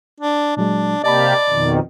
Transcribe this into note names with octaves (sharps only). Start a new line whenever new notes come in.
D4
A#2 F#3 G#3 D4
C3 A#3 G4 D5 D#5 A5 B5
F2 B2 D#3